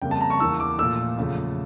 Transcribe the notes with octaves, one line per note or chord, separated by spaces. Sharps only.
F2 C#3 G3 A#3 G5
A5
A#5
C#6
E2 E3 A#3 E6
D6
A#2 F3 A3 E6
E2 C#3 F3 A3